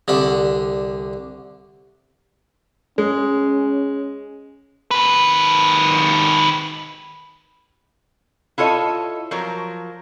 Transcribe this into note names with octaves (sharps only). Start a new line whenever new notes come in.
C2 D3 B5
G#3 C#4
D#3 B4
E4 F4 A4 C#5 D#5
F3 F#3 A#4